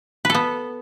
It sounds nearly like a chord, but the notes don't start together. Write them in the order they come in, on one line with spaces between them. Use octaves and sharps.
B4 A4 B3